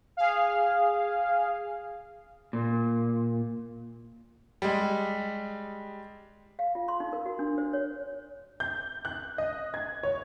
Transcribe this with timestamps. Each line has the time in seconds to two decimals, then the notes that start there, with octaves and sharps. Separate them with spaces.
0.17 G#4 F5
2.53 A#2
4.62 G3 G#3
6.59 F5
6.75 F4
6.88 C6
7.00 D#4
7.13 A#4
7.26 F#4
7.39 D4
7.58 C5
7.73 C#5
8.60 G6
9.05 F#6
9.38 D#5
9.74 G#6
10.03 C#5